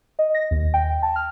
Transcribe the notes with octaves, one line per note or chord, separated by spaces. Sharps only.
D#5
A#6
D#2
G5
A5
F6